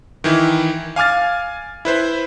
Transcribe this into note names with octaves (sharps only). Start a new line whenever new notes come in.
D#3 E3 E4
F5 G#5 D6 F6 A6
E4 B4 C5